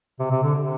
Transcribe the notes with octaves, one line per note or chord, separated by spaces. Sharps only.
C3
C3
D3
C3